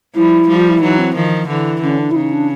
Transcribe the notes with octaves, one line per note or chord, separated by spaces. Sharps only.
F3 G3 E4
F3 G3
F4
E4
E3 F#3 D#4
C4
D#3 F3
D3 E3
D3 C#4
D4
E4
C#3 D#4
D4